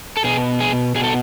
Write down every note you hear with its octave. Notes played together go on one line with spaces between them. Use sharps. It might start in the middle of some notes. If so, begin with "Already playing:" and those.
A4
B2 G#4
G#4
B2 G#4
A4